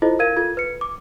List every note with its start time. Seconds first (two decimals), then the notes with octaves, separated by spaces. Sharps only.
0.02 E4 F4 A4 C5 D#5
0.19 A#4 F5 G#6 D#7
0.36 F4 A4 G#6
0.57 B4 C#7
0.81 D6